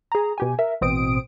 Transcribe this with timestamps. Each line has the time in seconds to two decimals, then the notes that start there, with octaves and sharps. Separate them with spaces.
0.12 G#4 A#5
0.38 B2 G4 G#5
0.59 A#4 E5
0.81 A1 B2 C4 D#6 D7